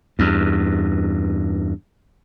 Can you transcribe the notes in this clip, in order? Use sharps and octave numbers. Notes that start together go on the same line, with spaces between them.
E2 G2